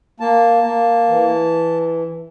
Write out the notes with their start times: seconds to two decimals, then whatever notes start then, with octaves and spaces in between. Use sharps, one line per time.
0.20 A#3 A5
0.64 A#3
1.08 E3